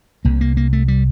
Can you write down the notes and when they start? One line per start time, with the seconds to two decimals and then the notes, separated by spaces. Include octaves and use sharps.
0.25 C2 C3 A#3
0.41 A#3
0.57 A#3
0.73 A3
0.88 G3